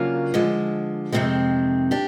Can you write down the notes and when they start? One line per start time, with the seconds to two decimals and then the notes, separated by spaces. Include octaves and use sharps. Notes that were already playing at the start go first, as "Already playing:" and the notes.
Already playing: C#3 F#3 A#3 D4 F4
0.34 D3 F3 G#3
1.12 F2 C3 D#3 G#3 C4
1.91 D4 G4